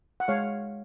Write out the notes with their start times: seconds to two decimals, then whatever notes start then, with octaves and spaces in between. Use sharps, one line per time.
0.20 F#5
0.28 G#3 C#5 F5